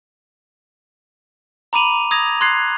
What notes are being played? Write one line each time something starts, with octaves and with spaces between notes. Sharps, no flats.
A#5 B5 D6 D#7 F7 F#7
D#6 G#6 A#6 F7
C6 F#6 G#6 C7